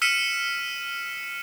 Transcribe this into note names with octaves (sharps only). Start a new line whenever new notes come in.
E6 F6 B6 C#7 D#7 E7